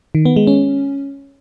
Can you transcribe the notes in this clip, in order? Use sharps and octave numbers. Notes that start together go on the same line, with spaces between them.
D#3
B3
G#3
C#4